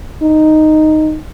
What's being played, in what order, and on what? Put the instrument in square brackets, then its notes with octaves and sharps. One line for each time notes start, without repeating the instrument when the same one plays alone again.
[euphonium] D#4